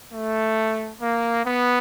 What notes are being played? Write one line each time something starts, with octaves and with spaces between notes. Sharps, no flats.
A3
A#3
B3